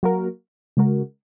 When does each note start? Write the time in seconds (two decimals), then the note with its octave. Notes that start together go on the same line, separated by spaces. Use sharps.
0.03 F#3 A#3 F#4 A#4
0.77 C#3 G#3 F#4 A#4